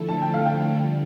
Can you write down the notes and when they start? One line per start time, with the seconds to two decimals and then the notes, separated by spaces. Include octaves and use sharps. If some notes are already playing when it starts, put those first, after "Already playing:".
Already playing: D3 F3 A3 E4 A4
0.09 A5
0.22 G5
0.34 F5
0.45 G5
0.72 D3 G3